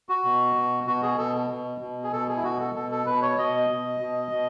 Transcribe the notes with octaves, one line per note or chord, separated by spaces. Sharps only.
F#4
B2
B2
B2 F#4
G#4
B2 A4
B2
B2
G#4
B2 A4
G#4
E4
B2 F#4
A4
B2 A4
A4
B2 B4
C#5
B2 D#5
B2
B2
B2